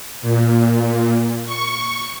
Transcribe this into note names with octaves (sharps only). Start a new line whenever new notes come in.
A#2
C#6